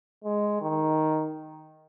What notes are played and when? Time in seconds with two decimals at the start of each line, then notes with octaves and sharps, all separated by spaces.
0.24 G#3
0.61 D#3